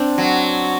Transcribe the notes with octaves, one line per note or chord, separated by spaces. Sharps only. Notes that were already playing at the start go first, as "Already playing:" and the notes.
Already playing: C4 D4
F#3